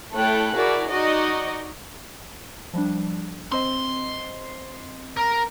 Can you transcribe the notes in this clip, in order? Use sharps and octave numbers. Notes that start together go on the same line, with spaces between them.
A3 E4 A4 C#5 G5 F#6
E4 F#4 G#4 A#4 D5
D#4 F#4 D5 D#5 C#6
F3 G3 D4
C4 C5 D#5 C6
A#4